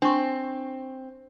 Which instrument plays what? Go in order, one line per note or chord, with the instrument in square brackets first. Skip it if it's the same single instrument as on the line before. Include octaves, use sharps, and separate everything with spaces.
[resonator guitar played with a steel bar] C4 [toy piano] D4 C#6